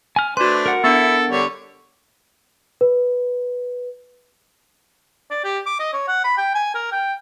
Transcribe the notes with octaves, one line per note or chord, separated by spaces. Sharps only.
G#5 F6
A3 D4 F#4 B4 C5 C6
A#4 F#5
B3 D4 E4 A4
D3 G3 C#5
B4
D5
G4
D6
D#5
C#5
F#5
B5
G5
G#5
A#4
G5